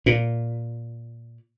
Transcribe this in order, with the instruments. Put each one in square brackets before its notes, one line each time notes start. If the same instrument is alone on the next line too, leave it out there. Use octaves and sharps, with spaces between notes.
[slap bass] A#2